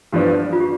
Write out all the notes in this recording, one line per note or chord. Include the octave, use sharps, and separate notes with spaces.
G2 F3 B3 D4
F4
G4